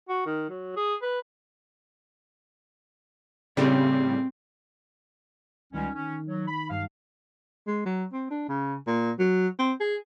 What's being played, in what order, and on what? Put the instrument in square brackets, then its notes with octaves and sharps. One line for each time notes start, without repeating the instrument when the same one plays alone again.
[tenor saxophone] F#4
D#3
F#3
G#4
B4
[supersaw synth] A2 C#3 G3 [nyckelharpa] C4
[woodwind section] C#2 G3 C#4 [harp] D#3
[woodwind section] C#4
F#3
B5
[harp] G2 [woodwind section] F5
[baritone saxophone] G#3
F#3
C4
D4
C#3
A#2
F#3
C4
G#4